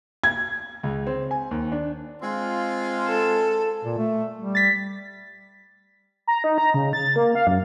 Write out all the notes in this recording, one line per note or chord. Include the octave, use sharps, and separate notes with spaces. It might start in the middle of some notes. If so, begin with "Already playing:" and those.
G#6
C#2
C4
G#5
D#2
D4
G#3 C4 F4
A4
A#2
A3
G3
A6 B6
A#5
D#4
A#5
C#3
A6
A#3
F5
F#2